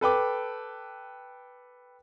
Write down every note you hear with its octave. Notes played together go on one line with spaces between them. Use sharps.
A4 B4 G5 D6